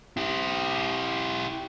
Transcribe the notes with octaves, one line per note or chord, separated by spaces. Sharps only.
E4 G4